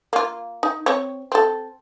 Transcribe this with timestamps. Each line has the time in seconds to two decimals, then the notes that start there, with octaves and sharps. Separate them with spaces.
0.13 A#3 F4
0.63 D#4
0.86 C4 C#5
1.32 C4 A4